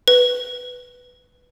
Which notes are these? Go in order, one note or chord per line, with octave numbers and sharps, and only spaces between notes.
B4